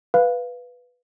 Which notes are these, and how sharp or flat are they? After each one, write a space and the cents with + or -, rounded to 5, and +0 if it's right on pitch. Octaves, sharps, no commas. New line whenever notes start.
B4 +0 F5 +0